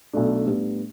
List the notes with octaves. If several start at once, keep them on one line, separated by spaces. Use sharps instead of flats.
B1 B2 A3 D4
A2 G3 B3 D4